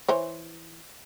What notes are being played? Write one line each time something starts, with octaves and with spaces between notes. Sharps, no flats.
E3 C5 C#5